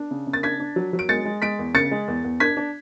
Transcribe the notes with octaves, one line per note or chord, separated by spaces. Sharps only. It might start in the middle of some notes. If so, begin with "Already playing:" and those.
Already playing: D4
C#3
C#3
A6
D4 G#6 B6
D4
F#3
F#3
D7
G#3 A6 C#7
G#3
G#3 B6 D7
E2
C#3 A6 C#7
G#3
E2
E2
D4 G#6 B6
D4